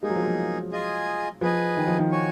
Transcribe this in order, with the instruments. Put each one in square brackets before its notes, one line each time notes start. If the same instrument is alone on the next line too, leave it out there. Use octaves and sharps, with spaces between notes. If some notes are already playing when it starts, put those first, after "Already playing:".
[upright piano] G#3 [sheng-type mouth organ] A#3 D#4 G#4
[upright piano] F#3
F3
F#3
[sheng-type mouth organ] F4 G#4 D#5 G#5
[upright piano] F3 [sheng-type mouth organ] G#4 B4 D#5 G#5
[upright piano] D#3
F3
D#3
[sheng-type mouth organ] F#4 C#5 G#5